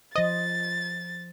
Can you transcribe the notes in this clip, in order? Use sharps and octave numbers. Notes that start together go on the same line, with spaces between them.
F3 C5 D#5 A6